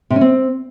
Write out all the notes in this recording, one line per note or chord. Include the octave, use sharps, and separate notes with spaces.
C3
C#4
C4